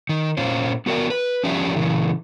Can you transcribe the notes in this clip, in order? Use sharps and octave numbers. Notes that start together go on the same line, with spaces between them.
D#3
A#2 C#4 F4 C5
B3 F#4 A#4 D5 G5
B4
F3 C#4 F4 G4 D5 E5
A#2 C#3 E3